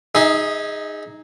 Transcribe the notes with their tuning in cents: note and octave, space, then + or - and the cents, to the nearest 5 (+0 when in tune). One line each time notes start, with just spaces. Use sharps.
D#4 +0 G#4 -10 E5 -35